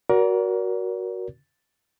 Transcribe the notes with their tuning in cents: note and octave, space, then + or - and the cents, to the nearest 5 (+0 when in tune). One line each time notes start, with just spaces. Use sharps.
F#4 +0 A#4 +20 D5 -40